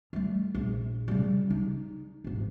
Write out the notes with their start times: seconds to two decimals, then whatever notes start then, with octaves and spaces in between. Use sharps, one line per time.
0.13 G3 A3
0.54 A#1
1.08 C#3 G3
1.50 D#4
2.24 D1 G#1